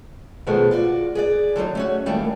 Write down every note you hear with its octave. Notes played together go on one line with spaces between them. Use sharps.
B2 D#3 F3 G#3 A3 B3
F4 F#4 D5
G#4 B4 D5
D3 F#3 C#4 D#4
A3 C#4 F#4
D#3 G3 A3 A#3 E4 G#5